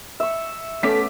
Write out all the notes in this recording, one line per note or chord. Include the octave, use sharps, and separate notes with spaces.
E5 C#6
A3 B3 C#4 A4 D6 B6